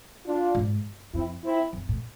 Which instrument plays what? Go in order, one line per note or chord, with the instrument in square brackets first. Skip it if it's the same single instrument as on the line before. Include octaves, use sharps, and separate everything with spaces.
[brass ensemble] D4 F4
[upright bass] G#2
[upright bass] F2 [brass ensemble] C4 E4
[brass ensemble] C4 E4
[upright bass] F2
A2